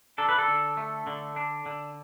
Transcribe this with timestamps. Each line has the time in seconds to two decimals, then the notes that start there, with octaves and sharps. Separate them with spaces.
0.18 D4 A4
0.29 B4
0.39 A4
0.48 D3
0.77 A3
1.07 D3
1.36 D4
1.66 D3